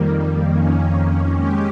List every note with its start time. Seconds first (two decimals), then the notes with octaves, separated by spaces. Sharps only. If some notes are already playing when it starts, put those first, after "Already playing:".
Already playing: F2 D#3 G3 A#3
0.45 F2 D#3 A#3 C#4
1.34 G#3 C#4 G4